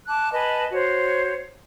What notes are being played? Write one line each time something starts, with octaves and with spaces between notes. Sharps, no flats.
A5 D6 F#6
B4 D#5 G#5 A5
F#4 C5 C#5